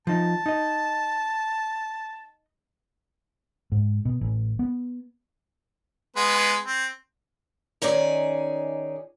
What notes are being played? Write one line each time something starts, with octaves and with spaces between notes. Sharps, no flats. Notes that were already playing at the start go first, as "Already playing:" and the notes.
F3 D#4 A5
D#4 D#5
G#2
B2
A1
B3
G#3 B3 B4
C4
D#3 C#4 D#4 G#4 D5